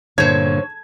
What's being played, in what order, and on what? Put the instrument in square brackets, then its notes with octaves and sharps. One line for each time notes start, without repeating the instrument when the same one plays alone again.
[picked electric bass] G2 A#2 [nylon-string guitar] D3 [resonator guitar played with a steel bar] C5 C#5 [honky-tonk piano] G#6